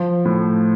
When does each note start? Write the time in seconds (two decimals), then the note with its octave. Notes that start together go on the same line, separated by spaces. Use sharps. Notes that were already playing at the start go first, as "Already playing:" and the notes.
Already playing: F3
0.25 A2